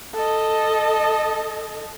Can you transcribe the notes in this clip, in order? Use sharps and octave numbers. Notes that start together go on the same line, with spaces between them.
A4 D#5